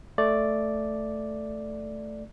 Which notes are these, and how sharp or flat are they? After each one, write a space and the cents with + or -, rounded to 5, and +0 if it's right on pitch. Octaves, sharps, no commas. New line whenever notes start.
A3 +0 D5 +0